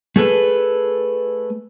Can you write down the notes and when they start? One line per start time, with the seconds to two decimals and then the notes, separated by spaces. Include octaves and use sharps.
0.16 A3 G#4 A4 B4